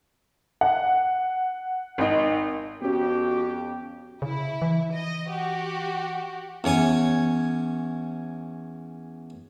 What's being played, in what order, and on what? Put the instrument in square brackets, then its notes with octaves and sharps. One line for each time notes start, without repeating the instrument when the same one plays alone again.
[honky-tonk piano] F#5
[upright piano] G#1 D#4
[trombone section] F2 G4 [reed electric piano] B3 C#4 [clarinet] F#4
[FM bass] C#3 [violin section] E4
[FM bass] E3
[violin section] D#5
F#4 G4
[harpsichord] E2 C#4 C#5 G#5